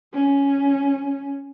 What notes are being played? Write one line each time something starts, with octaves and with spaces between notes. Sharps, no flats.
C#4